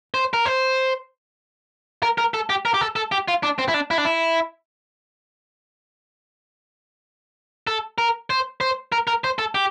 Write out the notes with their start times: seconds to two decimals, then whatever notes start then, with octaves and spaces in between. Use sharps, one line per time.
0.14 C5
0.33 A#4
0.46 C5
2.03 A#4
2.18 A#4
2.34 A4
2.50 G4
2.65 A#4
2.74 G4
2.81 A4
2.96 A4
3.12 G4
3.28 F4
3.43 D4
3.59 C4
3.68 E4
3.74 D4
3.91 E4
3.98 D4
4.05 E4
7.67 A4
7.98 A#4
8.30 C5
8.61 C5
8.92 A#4
9.07 A#4
9.24 C5
9.39 A4
9.55 G4